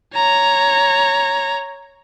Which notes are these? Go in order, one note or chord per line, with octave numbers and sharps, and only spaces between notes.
C#5 A#5